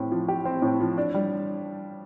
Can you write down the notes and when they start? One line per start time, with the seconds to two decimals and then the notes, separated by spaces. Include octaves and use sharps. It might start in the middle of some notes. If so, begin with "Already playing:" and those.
Already playing: A2 C4 G4
0.12 F3
0.28 G4
0.45 C4
0.62 A2
0.80 F3
0.97 D4
1.14 G3